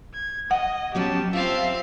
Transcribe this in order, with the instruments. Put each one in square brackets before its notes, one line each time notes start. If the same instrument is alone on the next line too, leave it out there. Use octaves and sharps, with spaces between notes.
[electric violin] G#6
[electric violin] D#5 [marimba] F#5
[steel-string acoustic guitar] F#3 B3 C#4 [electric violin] G4 A5
[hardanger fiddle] C4 F5 [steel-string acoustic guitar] F4 [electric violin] E5